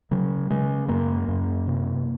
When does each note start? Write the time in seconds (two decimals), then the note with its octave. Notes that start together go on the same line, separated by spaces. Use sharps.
0.11 C#3 F#3
0.50 C#3 G#3
0.89 F#2 A#3
1.28 F#2
1.67 C3